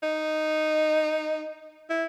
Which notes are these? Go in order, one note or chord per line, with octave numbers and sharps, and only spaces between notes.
D#4
E4